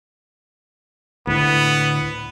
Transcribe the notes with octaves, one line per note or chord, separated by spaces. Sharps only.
D2 A2 B3